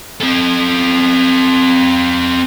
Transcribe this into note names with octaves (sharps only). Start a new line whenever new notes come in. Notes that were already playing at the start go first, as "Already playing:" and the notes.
C4 A4